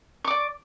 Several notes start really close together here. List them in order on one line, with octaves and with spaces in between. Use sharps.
C#6 D6 D5